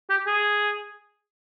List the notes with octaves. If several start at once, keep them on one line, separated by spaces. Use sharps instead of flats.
G4
G#4